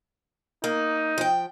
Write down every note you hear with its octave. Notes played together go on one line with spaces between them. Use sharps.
A#3 D#4
F3 G5